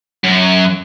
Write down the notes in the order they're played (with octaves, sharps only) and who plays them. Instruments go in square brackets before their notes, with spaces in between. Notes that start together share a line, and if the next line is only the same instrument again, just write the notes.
[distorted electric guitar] F#2